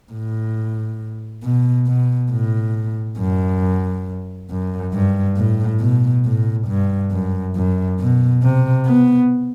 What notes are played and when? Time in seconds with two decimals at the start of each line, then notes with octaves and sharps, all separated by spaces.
0.12 A2
1.43 B2
1.87 B2
2.31 A2
3.19 F#2
4.50 F#2
4.94 G2
5.37 A2
5.80 B2
6.25 A2
6.68 G2
7.12 F#2
7.56 F#2
8.00 B2
8.43 C3
8.86 B3